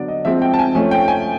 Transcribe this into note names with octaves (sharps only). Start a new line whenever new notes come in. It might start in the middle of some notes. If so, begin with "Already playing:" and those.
Already playing: D3 F#3 B3 D4 D5
D#5
F3 G#3 C4 E5
G5
A5
G#5
F3 A3 C#4 G#5
G5
G#5